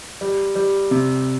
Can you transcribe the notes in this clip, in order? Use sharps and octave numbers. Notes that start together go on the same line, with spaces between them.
G3
G3
C3